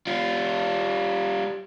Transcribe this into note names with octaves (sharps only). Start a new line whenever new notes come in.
G3 F4